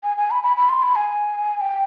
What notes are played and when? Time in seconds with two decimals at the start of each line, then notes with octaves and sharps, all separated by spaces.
0.04 G#5
0.18 G#5
0.31 B5
0.43 B5
0.57 B5
0.69 C6
0.82 B5
0.96 G#5
1.61 G5